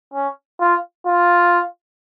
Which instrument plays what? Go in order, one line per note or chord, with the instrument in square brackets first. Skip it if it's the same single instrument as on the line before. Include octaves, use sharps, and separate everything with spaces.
[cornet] C#4
F4
F4